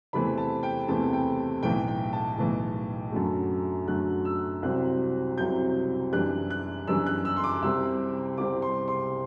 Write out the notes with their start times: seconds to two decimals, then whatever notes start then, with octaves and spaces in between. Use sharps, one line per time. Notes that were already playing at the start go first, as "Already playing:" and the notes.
0.13 E2 C3 E3 A3 C4 B5
0.37 A5
0.63 G5
0.88 E2 C3 E3 A3 C4 A5
1.13 G5
1.63 B1 A2 E3 G5
1.88 G5
2.13 A5
2.38 B1 A2 E3
3.12 F#2 D3 F#3 A3
3.88 F#2 D3 F#3 A3 F#6
4.25 E6
4.62 C2 C3 F#3 C4 F#6
5.38 C2 C3 F#3 C4 G6
6.12 F#2 E3 G3 D4 F#6
6.50 F#6
6.87 F#2 E3 G3 D4 E6
7.06 F#6
7.25 E6
7.37 C6
7.44 D6
7.62 C2 C3 G3 C4 E6
8.38 C2 C3 G3 C4 D6
8.62 C6
8.88 C6